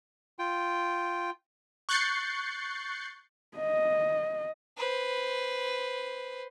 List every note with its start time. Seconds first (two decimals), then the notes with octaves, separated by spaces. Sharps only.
0.39 F4 G5
1.89 C#6 F#6 G6 A6 C7 C#7
3.57 D#5
4.77 B4 C5